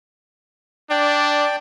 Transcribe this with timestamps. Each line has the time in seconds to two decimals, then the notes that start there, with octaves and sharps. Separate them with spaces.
0.90 D4 D5 G5